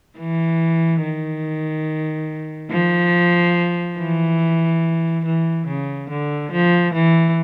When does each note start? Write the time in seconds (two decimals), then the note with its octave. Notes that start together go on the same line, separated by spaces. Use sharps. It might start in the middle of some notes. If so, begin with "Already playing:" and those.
0.18 E3
1.02 D#3
2.71 F3
3.98 E3
5.25 E3
5.67 C#3
6.10 D3
6.52 F3
6.94 E3